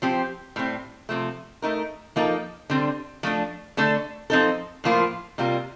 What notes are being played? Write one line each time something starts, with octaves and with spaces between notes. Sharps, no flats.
F3 C4 G4
A2 G3 C4
C3 F3 A3
A3 D#4 A#4
F3 A#3 D#4 A4
D3 G3 C4
F3 A3 D4
D3 A3 D4 A4
F3 C4 D#4 A4
A2 F3 A#3 F4
C3 G3 A#3 F4